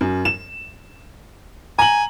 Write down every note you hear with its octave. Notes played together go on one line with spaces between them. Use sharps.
F#2
E7
G#5 A#5 F#7